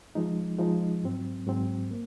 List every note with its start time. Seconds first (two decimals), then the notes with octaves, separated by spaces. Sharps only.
0.15 F3 G#3 D#4
0.59 F3 G#3 D#4
1.03 G#2 F#3 C4
1.46 G#2 F#3 C4
1.91 A#3